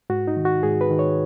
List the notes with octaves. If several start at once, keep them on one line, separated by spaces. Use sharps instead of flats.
G#2 F#4
D#4
D#3
F#4
G#2 G#4
B4
D#3
C#5